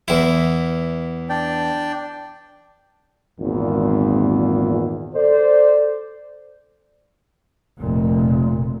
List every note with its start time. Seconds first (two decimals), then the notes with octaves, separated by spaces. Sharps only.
0.08 E2 E4
1.30 D4 D5 G5
3.40 G#1 E2 A#2
5.15 A4 C5 D5
7.78 F1 A#2